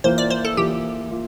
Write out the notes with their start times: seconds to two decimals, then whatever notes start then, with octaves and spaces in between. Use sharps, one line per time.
0.04 E3 A#3 F4 C5
0.18 D5
0.30 C5
0.45 A4
0.57 E3 A#3 F4 G4
1.11 A#3 F4